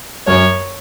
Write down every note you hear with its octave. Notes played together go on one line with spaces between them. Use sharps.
F#2 C#5